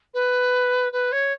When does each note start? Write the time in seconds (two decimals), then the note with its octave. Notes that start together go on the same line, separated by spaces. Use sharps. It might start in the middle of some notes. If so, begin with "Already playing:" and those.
0.14 B4
0.92 B4
1.12 C#5